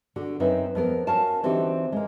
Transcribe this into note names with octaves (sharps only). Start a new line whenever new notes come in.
D3 F#4
F#2 C4 D#4 B4 E5
F2 B3 A#4
C#4 F#4 A#4 C#5 F5 A5
D3 E3 C4 D#4 F#4 G4
G#3 A#3